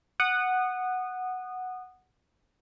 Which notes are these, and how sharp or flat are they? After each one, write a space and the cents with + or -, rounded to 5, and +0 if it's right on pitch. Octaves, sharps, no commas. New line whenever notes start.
F#5 +0 D#6 -20